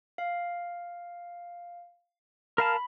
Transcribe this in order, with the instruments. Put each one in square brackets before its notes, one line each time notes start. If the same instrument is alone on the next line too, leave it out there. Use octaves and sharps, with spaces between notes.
[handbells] F5
[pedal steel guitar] A#4 F5 A5 [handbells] B5